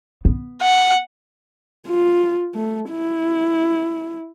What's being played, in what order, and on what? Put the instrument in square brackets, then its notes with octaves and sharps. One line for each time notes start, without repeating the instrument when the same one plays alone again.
[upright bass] B3
[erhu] F#5
[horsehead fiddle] F4
A3
E4